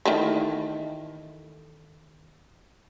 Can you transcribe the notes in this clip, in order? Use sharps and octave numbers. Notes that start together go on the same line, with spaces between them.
D#3 E3 A3